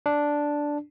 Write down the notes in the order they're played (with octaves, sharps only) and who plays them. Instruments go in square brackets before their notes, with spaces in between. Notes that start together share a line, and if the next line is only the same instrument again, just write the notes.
[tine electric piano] D4